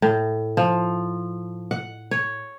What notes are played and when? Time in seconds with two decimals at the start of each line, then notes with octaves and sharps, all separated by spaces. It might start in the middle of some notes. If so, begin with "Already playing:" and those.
0.02 A2
0.57 F3
1.71 F#5
2.11 C#5